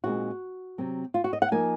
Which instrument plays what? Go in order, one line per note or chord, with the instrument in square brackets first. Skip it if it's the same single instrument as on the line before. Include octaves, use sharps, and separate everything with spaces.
[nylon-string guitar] A#2 G#3 C4 D#4 F#4
C3 F#3 C4
F4
F#4
D#5
F#5
F3 A#3 D#4 G#5